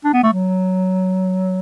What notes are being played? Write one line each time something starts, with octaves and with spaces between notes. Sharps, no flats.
D4
B3
A3
F#3